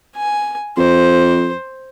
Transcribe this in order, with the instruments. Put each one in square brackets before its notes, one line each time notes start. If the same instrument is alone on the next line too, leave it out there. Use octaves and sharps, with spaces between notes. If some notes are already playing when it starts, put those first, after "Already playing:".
[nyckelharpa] G#5
[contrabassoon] F2 [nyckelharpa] C5